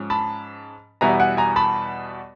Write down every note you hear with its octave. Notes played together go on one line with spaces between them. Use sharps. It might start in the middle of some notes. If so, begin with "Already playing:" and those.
Already playing: G#2 F3 C#4
A5 B5
E2 B2 G3 B3 E4 G#5 A#5
F#5 G#5
G#5 A#5
A5 B5